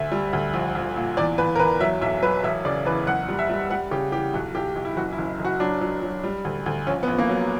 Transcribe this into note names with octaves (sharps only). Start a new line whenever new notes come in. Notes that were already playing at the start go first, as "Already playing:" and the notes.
Already playing: D2 E5
G3
D2
A#1
A#1
A#2
E2 D5
E2 B4
A#4
E2 B4
F#3 E5
B1 E5
F#3 B4
E1 E5
C#3 D5
E2 B4
F#1 F#5
G3
E5
G3
G3 F#5
C#3 G4
E3 G4
B1 F#4
B1 G4
B1
E4
F#1 F#4
E4
F#1
F#1
F#4
F#3 D4
F#3
F#3
G3
D2
D2
A#1 C#4
B3
A#1
A#3
F#3